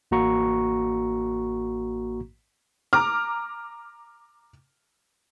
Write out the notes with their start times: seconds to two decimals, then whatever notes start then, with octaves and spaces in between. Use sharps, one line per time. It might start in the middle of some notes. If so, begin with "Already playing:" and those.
0.11 A1 A#3 F#4 A#5 C#6
2.93 A#5 D6 F6